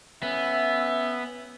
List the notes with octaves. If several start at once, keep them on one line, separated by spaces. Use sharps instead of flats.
A2 B3 C#4 E5